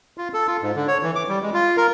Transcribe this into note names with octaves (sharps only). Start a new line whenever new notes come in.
F4
A4
F4
G#2
D3
C#5
E3
D6
G3
G#3
F4
A#4